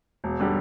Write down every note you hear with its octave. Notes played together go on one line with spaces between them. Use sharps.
E1
D3 G3